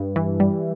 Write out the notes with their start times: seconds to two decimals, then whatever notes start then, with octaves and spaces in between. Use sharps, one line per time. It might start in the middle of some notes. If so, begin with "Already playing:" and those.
Already playing: G2
0.16 E3
0.40 G3